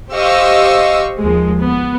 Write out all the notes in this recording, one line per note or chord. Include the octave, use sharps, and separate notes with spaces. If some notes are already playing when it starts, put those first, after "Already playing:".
G4 C5 D#5 F5 C#6 E6
D#2 F3 G#3
B3